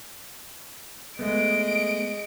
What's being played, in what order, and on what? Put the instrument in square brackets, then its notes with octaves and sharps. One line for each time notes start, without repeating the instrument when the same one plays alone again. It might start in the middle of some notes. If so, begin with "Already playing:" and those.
[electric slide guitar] G#3 A3 B3 [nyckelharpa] G#4 D#5 [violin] D7